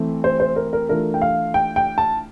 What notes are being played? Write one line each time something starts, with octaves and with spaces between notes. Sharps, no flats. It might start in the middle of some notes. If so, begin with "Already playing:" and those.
Already playing: E3 A3 C4
C5
C5
A#4
A#4
E3 A3 D4 F4 A#4
G5
F5
G5
G5
A5